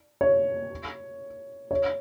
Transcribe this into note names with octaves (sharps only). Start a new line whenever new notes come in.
C#5
C#5